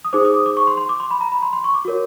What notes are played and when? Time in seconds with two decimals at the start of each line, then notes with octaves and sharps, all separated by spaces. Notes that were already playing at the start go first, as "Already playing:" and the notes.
0.05 D#6
0.13 D#4 G#4 C5 D6
0.25 D#6
0.34 D6
0.46 D6
0.57 C#6
0.67 C6
0.77 C6
0.89 D6
1.00 C6
1.11 B5
1.21 A#5
1.32 B5
1.42 C6
1.53 C6
1.64 C#6
1.74 D6
1.85 F#4 A#4 C#5